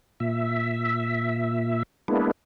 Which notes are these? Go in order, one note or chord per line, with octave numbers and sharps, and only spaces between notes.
A#2 E5
G#3 A#3 B3 D4 E4